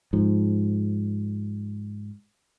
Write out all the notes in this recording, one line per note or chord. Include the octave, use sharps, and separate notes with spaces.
G#2 F3